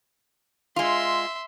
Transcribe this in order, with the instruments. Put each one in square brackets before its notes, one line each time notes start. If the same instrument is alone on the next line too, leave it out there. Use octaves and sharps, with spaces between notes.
[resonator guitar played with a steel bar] G#3 F4 [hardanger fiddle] E5 C6